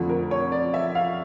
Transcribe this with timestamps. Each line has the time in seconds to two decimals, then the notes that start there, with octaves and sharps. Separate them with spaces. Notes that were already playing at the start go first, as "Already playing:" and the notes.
Already playing: F2 D3 F3 A3
0.09 A#4
0.31 C#5
0.52 D5
0.74 E5
0.95 F5